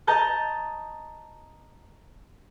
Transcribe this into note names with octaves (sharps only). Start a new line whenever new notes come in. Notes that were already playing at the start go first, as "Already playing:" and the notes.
D#5 A5 A#5 G6 A6